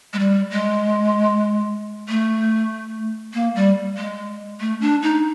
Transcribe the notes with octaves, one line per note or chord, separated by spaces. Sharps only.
G#3
G3
G#3
A3
A#3
G3
G#3
A3
D4
D#4